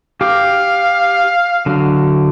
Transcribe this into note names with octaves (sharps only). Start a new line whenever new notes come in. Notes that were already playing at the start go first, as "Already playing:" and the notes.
G4 F5 D6
D3 F#3